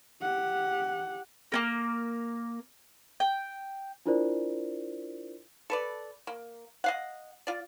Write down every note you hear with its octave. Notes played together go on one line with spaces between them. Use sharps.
G4 F#5
A#3 B3 A#4
G5
D4 E4 F4 A#4 C5 D5
A4 B4 D5
A#3
D#5 F5 F#5
F4 D5